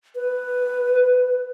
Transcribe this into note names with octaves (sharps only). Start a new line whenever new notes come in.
B4